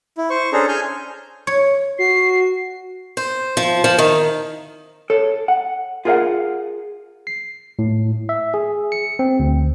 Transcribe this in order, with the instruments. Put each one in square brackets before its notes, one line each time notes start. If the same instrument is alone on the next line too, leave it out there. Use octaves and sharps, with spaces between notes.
[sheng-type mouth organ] E4
C5 C#6
C#4 D4 G#4 A4 C5 A#5
G#5 F6 G6
[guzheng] C#5
[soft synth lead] F#4 [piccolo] C7
[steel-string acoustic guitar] C5
F3
F3
D#3
[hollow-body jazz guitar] A4 C#5
F#5
F4 G#4 A#4 D5 F5 F#5
[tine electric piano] C7
A2
E5
G#4
C#7
C4
D2